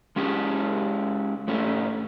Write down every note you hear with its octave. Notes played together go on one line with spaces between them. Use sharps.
G#3 C#4 G4 G#4
G#2 A3 C#4